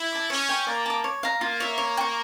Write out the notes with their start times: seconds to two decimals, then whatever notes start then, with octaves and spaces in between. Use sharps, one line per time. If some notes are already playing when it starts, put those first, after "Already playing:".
Already playing: E4
0.12 A5 D6
0.30 C#4 C#5
0.49 G5 C#6
0.67 A#3 D5
0.86 A5 D6
1.04 C#5
1.23 F5 A#5
1.41 A#3 F4
1.60 C#5 E5
1.78 C#5
1.97 G5
2.01 C#6